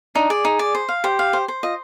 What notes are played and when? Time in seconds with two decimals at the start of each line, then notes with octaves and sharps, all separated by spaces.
0.15 D4 D#4
0.30 G#4 D5
0.45 D#4
0.59 D5
0.75 C5
0.89 F5
1.04 G4 C5
1.19 F5
1.33 C5
1.48 C5
1.63 F4 D#5